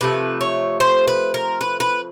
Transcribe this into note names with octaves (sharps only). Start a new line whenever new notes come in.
C3 F3 A3 B4
C#5
C5
B4
A#4
B4
B4